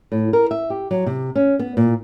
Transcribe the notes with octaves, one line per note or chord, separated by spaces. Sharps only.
A2
A#4
E5
G4
F#3
C3
C#4
B3
A#2